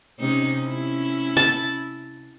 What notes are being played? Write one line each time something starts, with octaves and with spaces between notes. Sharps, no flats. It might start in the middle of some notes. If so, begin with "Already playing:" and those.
C3 C#4 D#4
C#4 E4
A5